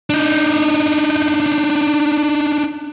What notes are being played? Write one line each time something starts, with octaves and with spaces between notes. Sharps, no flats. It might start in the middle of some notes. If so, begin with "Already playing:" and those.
D4 D#4